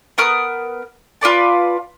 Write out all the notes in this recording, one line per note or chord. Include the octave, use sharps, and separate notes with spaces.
B3 A#4 D#6 F6
F4 B4 D5 A5